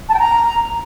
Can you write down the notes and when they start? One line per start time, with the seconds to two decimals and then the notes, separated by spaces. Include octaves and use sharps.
0.08 A5
0.13 G5
0.19 A#5